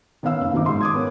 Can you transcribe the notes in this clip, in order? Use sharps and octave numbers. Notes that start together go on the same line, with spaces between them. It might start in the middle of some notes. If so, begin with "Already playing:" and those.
D#3 B3 C#4 F5 E6
F#1
G1 D#3 F#3 C4 D#4 D6
G#2 C6
D6 D#6 G#6
B3 C#4 A#4